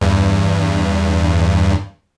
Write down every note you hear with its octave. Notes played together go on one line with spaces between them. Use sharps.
E2 G2